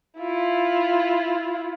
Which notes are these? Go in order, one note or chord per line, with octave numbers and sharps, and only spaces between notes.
E4 F4